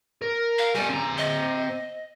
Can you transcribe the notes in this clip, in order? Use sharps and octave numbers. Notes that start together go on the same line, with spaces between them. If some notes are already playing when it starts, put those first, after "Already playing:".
A#4
F5
G3 A4 G#5
C4 A#5
D#5